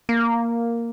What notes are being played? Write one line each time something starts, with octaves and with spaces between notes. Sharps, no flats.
A#3